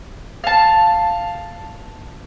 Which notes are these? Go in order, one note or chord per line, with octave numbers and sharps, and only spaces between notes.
F5 A5